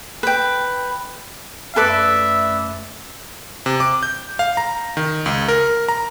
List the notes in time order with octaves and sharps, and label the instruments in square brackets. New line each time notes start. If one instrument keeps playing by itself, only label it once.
[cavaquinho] B4 G5
[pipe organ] F#2 A3 [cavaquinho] A4 B4 D5 [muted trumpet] E5
[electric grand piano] C3
D6
G6
F5
A#5
D#3
C#2
A#4
A#5